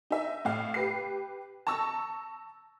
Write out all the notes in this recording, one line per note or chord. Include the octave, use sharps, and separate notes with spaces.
D#4 E5
A2 F5
G4 B4 C7
A5 A#5 C#6 E6